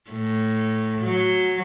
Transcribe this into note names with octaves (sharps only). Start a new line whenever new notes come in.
A2
F#3